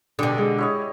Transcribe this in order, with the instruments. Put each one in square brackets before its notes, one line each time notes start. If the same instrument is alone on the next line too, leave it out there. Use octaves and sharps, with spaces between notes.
[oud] B2 D3 [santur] D4 G4 G#4
[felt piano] G#3
[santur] E4 C#5 D#5